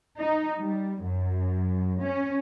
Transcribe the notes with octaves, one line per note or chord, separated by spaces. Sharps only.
D#4
G3
F#2
C#4